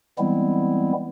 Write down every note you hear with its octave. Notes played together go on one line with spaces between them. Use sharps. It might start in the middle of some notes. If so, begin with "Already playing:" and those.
E3 G3 G#3 B3 C4 E4